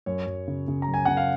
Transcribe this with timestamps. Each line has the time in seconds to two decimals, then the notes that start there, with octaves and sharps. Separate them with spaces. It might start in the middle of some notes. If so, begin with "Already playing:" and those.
0.06 F#2 C#5
0.27 F#2
0.48 C#3
0.68 C#3
0.82 A#5
0.88 F#2
0.94 G#5
1.05 C#3 F#5
1.17 F5